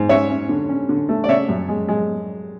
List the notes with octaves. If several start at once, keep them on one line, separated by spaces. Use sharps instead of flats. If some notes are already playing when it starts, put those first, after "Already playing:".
Already playing: G#2
C#4 C#5 E5
C#4
D3
C#4
D3
A3
D5
C#3 C#5 E5
F#2
G#3
G#3